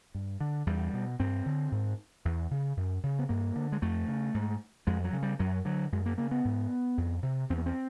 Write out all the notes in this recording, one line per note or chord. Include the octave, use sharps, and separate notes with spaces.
G2
D3
E2 G3
B2
G2 C4
D3
G#2
E2
C#3
F#2
C#3
B3
G2 A#3
D3
G#3
F2 A3
C#3
G#2
F2 G#3
F#3
C#3
G3
F#2 F#3
D3 F#3
F#2 G#3
A#3
C#3 A#3
B3
G#2
F2
C3
E2 C4
B3
C4